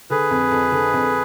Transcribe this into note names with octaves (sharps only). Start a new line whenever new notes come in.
D3 G#4 B4
F2
F2
D3
F2